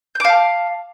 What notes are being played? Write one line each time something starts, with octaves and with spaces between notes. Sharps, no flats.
F5 A5 D6 G6